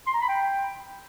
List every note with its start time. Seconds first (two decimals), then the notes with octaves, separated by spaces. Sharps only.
0.06 C6
0.14 A#5
0.21 B5
0.28 G5